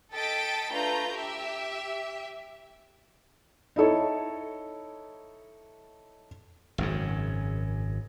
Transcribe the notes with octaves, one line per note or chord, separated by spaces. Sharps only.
A4 D#5 G5 A6 B6 D7
A3 D4 F4 B4 A#5 G6
G4 E5
D#4 E4 A4 C#5
G#1 F#2 C#3